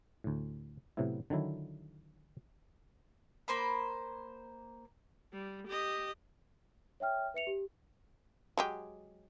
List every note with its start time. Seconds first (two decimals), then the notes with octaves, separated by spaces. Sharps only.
0.24 D2 A2
0.97 A2 C3 F#3 B3 E4
1.30 D3 D#3 F#3 E4
3.48 A#3 C5 B5
5.33 G3
5.67 G4 D#5
7.00 C#5 E5 G5 F6
7.34 B4 E5 C#7 F7
7.47 G4
8.57 F#3 G#3 G4